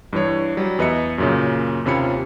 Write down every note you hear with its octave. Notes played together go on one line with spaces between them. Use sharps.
G2 E3 C#5
F#3 G3
E2 B4 D#5 E5 C#7
F#2 A#2 C#3
D#2 C3 C#4 F4 B5 C#7